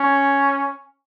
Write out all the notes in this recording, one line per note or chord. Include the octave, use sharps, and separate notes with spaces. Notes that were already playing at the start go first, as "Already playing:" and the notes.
Already playing: C#4